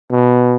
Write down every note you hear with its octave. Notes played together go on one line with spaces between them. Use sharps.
B2